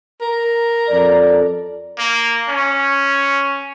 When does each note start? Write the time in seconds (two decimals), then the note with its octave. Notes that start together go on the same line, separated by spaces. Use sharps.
0.21 A#4
0.88 F2 A4 D5
1.99 A#3
2.49 C#4